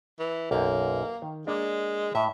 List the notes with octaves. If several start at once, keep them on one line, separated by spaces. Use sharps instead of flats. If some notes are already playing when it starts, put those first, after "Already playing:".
E3
B1 F#2 A#3
D#3
G#3 A#3 D4
A2 E5